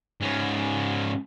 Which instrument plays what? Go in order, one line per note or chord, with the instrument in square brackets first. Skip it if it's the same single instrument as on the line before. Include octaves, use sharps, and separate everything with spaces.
[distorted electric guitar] G#2 C#4